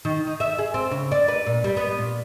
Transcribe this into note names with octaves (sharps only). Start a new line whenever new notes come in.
D#3
D#4
E5
G#4
C4
C#3
D5
B4
A#2
G3
B3
A#2